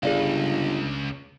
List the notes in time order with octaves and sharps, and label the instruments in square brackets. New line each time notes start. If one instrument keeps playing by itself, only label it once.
[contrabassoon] G1 [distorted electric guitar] C#2 [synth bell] G#4 D5 F5